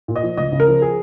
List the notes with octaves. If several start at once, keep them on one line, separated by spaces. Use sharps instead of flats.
A#2
D#5
F3
C#2 D#5
C#3
A#4
F3
G#4